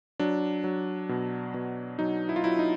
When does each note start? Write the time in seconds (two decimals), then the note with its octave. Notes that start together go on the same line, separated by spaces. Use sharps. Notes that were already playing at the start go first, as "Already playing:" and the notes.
0.20 F#3 D4
0.64 F#3
1.09 B2
1.54 B2
1.99 F#3 D#4
2.29 E4
2.36 F4
2.44 F#3 E4
2.59 D#4